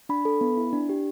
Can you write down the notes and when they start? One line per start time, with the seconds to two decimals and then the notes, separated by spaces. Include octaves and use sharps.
0.09 D4 B5
0.25 A4
0.41 B3
0.57 E4
0.73 D4
0.89 G4